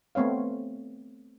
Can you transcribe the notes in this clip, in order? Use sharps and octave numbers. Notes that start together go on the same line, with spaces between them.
A3 B3 C4 C#5 F5